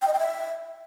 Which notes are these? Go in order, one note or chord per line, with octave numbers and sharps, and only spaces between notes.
G5
D#5
G5
E5